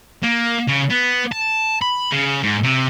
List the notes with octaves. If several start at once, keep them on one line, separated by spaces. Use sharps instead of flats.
A#3
C#3
B3
A5
B5
C#3
G#2
C3